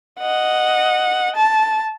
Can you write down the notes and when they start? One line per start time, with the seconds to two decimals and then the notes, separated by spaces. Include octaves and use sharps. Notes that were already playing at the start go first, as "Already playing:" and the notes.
0.19 D#5 F#5
1.36 A5